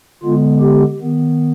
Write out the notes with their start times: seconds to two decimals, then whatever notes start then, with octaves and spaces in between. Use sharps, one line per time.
0.23 D3 G#3 B3 F4
0.61 G4
1.00 D#3 B3